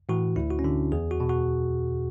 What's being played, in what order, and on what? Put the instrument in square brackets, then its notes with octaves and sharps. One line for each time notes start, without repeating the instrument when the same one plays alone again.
[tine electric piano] A2 E3 F#4
D2 E4
F#4
C#4
D3 D4
E2 G#4
F#4
B2
F#4